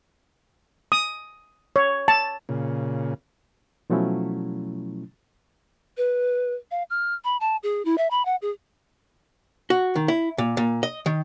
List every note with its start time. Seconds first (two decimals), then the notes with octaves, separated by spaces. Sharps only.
0.92 D#6
1.76 C#5
2.08 A5
2.49 A#2 C#3
3.90 B2 F3 F#3 A3 C#4 E4
5.97 B4
6.71 F5
6.90 F6
7.24 B5
7.40 A5
7.63 G#4
7.85 E4
7.98 E5
8.10 B5
8.25 F#5
8.42 G#4
9.70 F#4
9.96 D#3
10.08 E4
10.38 A#2
10.57 A#2
10.83 D#5
11.06 D#3